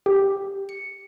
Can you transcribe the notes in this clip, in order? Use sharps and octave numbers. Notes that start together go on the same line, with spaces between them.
G4
C#7